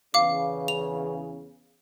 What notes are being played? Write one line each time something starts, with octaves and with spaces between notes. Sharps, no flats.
E2 C#3 F5 D6
F7